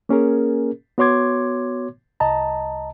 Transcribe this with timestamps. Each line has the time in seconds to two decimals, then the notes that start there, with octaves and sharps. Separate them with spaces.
0.09 A#3 C#4 G#4 A#4
0.98 B3 F#4 C#5 C6 D6 G#6
2.20 C2 D#5 A5 A#5